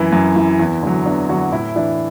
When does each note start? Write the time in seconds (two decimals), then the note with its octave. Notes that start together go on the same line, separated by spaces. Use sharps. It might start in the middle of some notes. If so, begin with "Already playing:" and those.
Already playing: F#2 E3 E4
0.12 F#2
0.36 E3
0.59 E2
0.83 D3 F#3
1.06 E2 D4
1.29 D3 F#3 F#4
1.52 A2 E4
1.76 E3 D4